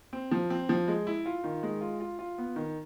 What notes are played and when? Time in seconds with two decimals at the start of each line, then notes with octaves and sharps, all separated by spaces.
0.13 C4
0.31 F3
0.50 C4
0.69 F3
0.88 G#3
1.07 E4
1.26 F4
1.44 D#3
1.63 G#3
1.81 F4
2.00 F4
2.19 F4
2.38 B3
2.56 D#3